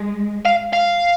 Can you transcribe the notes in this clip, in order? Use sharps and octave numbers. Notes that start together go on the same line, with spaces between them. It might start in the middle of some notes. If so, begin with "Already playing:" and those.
Already playing: G#3
F5
F5